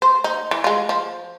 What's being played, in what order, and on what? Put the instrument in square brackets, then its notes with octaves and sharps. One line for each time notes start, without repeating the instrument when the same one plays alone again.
[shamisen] C5
D#4
E3
G#3 F4
F3